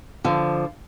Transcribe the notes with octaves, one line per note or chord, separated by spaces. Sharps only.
D3 F3